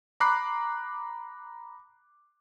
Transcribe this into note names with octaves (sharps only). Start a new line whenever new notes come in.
A#5 B5 D6 F#6 C7